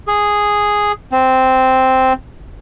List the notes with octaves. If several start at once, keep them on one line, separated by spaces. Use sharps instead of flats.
G#4
C4